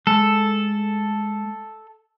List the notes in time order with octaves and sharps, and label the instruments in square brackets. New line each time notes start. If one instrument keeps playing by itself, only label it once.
[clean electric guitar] G#3 A3 [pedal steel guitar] A4